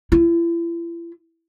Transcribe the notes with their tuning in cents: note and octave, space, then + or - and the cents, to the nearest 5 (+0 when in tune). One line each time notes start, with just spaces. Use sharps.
E4 +40